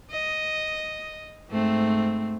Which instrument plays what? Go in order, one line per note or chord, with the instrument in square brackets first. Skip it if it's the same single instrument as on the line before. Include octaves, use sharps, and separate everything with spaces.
[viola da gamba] D#5
G#2 A3 C4